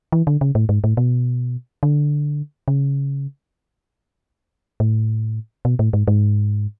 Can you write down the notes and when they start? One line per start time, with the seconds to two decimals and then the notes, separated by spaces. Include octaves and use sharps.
0.12 E3
0.27 D3
0.41 C#3
0.55 A2
0.69 G#2
0.84 A2
0.97 B2
1.83 D3
2.68 C#3
4.80 A2
5.65 B2
5.79 A2
5.93 G#2
6.08 G#2